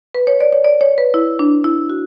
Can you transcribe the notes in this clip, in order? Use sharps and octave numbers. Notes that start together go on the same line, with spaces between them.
B4
C#5
D5
C#5
D5
C#5
B4
E4
D4
E4
F#4